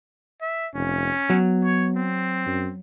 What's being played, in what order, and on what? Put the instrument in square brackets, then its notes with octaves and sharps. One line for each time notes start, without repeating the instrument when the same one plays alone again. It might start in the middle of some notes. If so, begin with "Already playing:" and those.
[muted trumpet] E5
[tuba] F1 [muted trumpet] C#4
[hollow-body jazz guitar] F#3 [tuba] B3
[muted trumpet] C#5
C4
[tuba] F#2